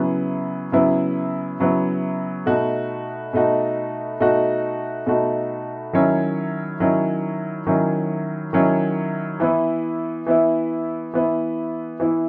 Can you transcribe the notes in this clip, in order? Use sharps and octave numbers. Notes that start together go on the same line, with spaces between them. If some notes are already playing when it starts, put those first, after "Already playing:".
Already playing: C#3 F#3 B3 E4
C#3 F#3 B3 E4
C#3 F#3 B3 E4
B2 A3 D#4 F#4
B2 A3 D#4 F#4
B2 A3 D#4 F#4
B2 A3 D#4 F#4
D#3 F#3 C#4 E4
D#3 F#3 C#4 E4
D#3 F#3 C#4 E4
D#3 F#3 C#4 E4
E3 B3 E4
E3 B3 E4
E3 B3 E4
E3 B3 E4